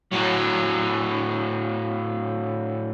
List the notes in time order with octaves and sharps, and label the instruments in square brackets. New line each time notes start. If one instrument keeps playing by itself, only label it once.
[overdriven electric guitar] A2 F#3